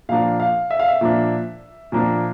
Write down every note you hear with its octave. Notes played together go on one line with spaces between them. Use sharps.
A#2 F3 A#3 D4 F5
F5
E5
F5
E5
A#2 F3 A#3 D4
A#2 F3 A#3 D4